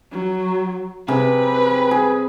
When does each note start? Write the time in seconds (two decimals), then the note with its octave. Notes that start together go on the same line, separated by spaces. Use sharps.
0.12 F#3
1.08 C3 G#4 B4 G5
1.91 G#4